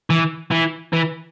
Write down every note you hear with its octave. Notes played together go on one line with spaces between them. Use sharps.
E3
E3
E3